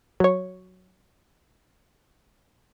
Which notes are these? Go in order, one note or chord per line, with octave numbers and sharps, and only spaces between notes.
F#3 C#5